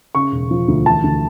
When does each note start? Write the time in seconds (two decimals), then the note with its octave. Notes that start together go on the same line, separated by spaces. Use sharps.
0.15 C#3 C#6
0.32 E1
0.51 F3
0.68 D2
0.86 E3 A5
1.03 D2